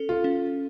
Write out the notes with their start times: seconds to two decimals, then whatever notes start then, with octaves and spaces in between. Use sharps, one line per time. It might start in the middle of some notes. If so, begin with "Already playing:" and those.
Already playing: C#4 A4
0.09 F4
0.24 C#4